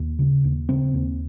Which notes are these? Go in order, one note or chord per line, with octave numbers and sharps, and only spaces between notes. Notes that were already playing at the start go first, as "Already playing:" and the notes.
Already playing: D#2
C#3
D#2
C#3 C4
D#2